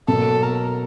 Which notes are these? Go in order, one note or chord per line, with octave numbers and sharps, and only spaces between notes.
B2 F#3 A#3 A4
A#4